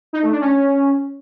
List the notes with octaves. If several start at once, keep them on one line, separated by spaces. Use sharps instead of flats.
D#4
A3
D4
C#4